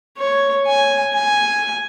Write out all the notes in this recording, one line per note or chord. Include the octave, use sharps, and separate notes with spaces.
C#5
G#5
G#5